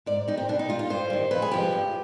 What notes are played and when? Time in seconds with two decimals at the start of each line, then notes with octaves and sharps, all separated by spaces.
0.06 G#2 D5
0.28 G3 D#4
0.38 C4
0.49 B2 D4
0.59 D#4
0.69 G3 F4
0.79 F4
0.90 G2 C5
1.10 D#3 G3
1.31 F2 B4
1.42 G#4
1.51 C3 F3 G#3 G4
1.72 G2